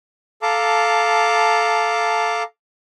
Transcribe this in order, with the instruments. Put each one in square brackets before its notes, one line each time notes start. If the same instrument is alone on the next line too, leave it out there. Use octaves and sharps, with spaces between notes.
[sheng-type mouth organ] A4 F5 A5 A#5 D6